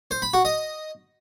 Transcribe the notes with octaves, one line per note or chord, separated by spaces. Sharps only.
C5
B5
F#4
D#5